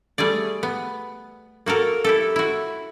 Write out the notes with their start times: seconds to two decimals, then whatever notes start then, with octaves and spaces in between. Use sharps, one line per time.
0.18 G3 A3 G#4 D5
0.63 B3
1.66 A#3 F#4 A4 A#4
2.04 E4 G4 A4
2.36 E4 F#4